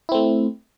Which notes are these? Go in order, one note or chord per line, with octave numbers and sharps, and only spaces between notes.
A3 C4 E4